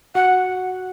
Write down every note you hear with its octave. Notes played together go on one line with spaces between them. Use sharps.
F#4 F#5